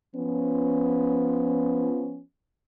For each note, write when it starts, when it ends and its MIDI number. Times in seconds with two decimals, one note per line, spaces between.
0.16 2.21 53
0.16 2.21 59
0.16 2.21 61